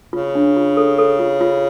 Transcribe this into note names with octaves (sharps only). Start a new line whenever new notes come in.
C#3 F4
D4
F4
A4
A4
F4
F4